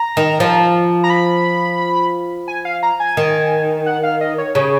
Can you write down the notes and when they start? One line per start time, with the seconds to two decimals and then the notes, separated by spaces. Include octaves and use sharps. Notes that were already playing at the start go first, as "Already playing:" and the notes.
Already playing: A#5
0.17 D#3
0.40 F3
1.04 A#5
1.10 B5
2.48 G#5
2.65 F5
2.83 A#5
3.00 G#5
3.17 D#3
3.86 F#5
4.03 F5
4.21 D#5
4.38 C#5
4.55 C#3 C#5